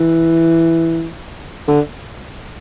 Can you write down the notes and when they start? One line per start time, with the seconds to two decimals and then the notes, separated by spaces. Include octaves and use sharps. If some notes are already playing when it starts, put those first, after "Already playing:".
Already playing: E3
1.68 D3